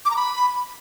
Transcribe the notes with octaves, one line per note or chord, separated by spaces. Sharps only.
D6
A#5
B5